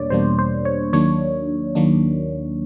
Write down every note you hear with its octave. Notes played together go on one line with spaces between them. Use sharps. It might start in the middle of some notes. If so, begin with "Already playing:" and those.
Already playing: E2 B2 G3 A#3 D4 C#5 D5
E2 B2 G3 A#3 D4 C5
C5
C#5
D#2 D#3 F#3 A#3 D4 C#5
D#2 D#3 F#3 A#3 D4